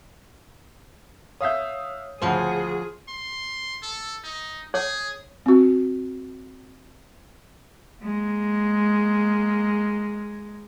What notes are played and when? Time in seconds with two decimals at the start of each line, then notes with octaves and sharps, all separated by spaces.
1.41 C#5 E5 F5 D#6 G6
2.22 D2 C#3 F3 G#4 C5 F#5
3.08 C6
3.82 A4
4.24 D#4
4.74 G#4 C#5
5.46 C4 F#4
8.02 G#3 A#3